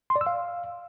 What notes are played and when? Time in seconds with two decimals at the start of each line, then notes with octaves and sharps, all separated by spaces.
0.10 C6
0.16 D5
0.21 E6
0.27 F5